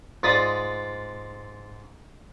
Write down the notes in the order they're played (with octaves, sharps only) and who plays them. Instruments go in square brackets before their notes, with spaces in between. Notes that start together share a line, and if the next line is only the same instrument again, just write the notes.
[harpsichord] G#2 F4 D5 B5 D#6